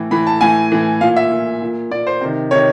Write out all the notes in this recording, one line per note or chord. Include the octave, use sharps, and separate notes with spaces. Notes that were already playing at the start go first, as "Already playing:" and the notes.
Already playing: A2 E3
A2 E3 B5
A5
A2 E3 G#5
A2 E3
A#2 F5
E5
A#2
A#2
A#2 D5
C5
C3 D#3
C3 D#3 C#5